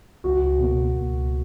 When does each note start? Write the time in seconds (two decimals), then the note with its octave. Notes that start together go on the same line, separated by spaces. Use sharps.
0.24 C#2 F#4
0.59 B2 A#3
0.95 C#2